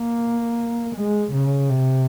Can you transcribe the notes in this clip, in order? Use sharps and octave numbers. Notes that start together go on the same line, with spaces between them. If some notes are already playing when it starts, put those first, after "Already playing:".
Already playing: A#3
G#3
C#3
C3